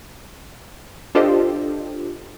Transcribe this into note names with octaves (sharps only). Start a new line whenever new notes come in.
D4 F4 G4 A4 C5 D#5